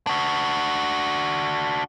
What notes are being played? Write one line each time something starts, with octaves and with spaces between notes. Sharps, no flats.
D4 F#4